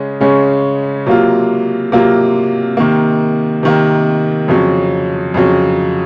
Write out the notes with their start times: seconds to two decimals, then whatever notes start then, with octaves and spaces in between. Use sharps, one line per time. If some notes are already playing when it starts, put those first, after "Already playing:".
Already playing: C#3 G#3 C#4
0.21 C#3 G#3 C#4
1.06 C3 F#3 A#3 F4
1.92 C3 F#3 A#3 F4
2.77 C3 D#3 A#3
3.63 C3 D#3 A#3
4.48 F2 C#3 F#3
5.34 F2 C#3 F#3